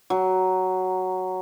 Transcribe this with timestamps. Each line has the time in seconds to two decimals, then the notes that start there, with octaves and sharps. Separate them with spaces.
0.10 F#3